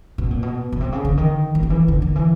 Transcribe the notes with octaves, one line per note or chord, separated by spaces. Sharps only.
B2
A#2
B2
B2
C3
C#3
D3
D#3
E3
D#3
E3
D3
D#3
E3